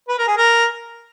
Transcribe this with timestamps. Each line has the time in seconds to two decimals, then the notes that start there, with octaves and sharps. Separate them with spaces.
0.08 B4
0.18 A#4
0.27 G#4
0.37 A#4